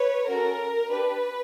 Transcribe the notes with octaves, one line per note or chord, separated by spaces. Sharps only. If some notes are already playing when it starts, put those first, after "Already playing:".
Already playing: B4 C#5
C#4 F#4 A4 A#4
D4 G4 B4